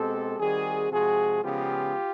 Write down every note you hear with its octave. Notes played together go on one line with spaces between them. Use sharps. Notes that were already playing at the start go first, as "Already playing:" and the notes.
Already playing: B2 G#3 C4 G4 A4
D#3 G3 C4 F#4 G#4
C3 F3 G#3 F#4 G#4
C#3 F3 G#3 B3 F4 G4